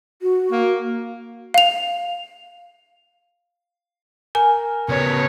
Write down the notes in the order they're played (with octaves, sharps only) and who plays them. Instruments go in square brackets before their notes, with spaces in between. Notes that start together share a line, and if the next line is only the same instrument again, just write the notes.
[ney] F#4
[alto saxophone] A#3
[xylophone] F5 F7
[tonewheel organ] A#4 [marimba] G#5
[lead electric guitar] C#3 B3 [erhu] C#5